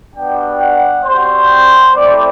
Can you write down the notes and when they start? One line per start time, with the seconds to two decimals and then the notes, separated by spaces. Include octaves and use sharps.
0.15 G3 B3 D4 F#4 G5
0.60 F#5
1.05 G3 C4 F#4 C5
1.95 A3 C4 E4 D5